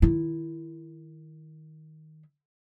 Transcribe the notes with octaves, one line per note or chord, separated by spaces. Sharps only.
D#3 E4